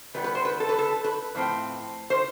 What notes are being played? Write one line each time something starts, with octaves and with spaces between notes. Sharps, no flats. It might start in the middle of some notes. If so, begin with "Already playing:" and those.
E3 G3 B3 B4
B4
C5
B4
A4
B4
A4
B4
A2 F3 C4
C5